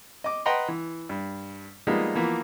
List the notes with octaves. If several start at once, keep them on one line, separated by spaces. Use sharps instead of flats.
D#5 D6
B4 D#5 F#5 G5 A#5 C6
E3
G2
F3 G3 G#3 A#3 B3 D#4
E3 F3 A#3 B3